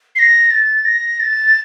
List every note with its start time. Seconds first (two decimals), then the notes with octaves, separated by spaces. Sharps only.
0.15 C7
0.19 A#6
0.51 A6
0.85 A#6
1.20 A6